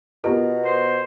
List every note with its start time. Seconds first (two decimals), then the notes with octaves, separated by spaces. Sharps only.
0.24 B2 B3 F4 G4 A#4
0.65 C5